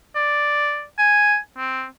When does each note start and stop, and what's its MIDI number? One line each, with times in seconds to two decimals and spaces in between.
0.16 0.83 74
0.98 1.37 80
1.58 1.86 60